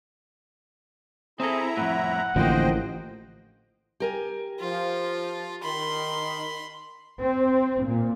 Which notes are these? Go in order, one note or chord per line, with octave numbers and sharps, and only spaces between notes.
C4 E4 G#4 A4 E5 A#5
F2 A2 F#5
A1 D3 F3 A#3 C5 D#5 G5
G4 A#4 G#5
F3 F4
D#3 B5 C6
C4
A#2